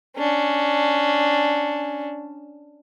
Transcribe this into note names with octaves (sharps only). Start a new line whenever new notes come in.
C#4 D4